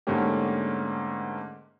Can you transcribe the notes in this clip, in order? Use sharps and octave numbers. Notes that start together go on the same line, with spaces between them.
G#2 D3 A3 A#3 C#4 G4